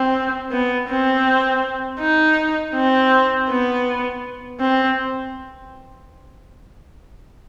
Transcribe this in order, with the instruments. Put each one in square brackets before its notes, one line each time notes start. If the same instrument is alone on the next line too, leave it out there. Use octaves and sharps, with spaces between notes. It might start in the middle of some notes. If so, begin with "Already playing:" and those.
Already playing: [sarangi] C4
B3
C4
D#4
C4
B3
C4